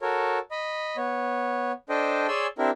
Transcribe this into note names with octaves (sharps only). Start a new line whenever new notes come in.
F#4 A4 A#4 C#5
D#5 B5
B3 C#5
D4 A4 C5 D#5 G5
G#4 C#5 D5 G#5 C6 E6
C4 D4 E4 G4 A#4